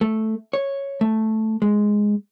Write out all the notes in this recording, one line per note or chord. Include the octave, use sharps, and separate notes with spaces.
A3
C#5
A3
G#3